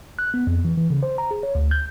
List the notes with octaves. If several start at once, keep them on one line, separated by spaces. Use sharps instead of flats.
F#6
B3
F2
E3
E3
C#3
C5
A#5
G#4
C#5
D2
G6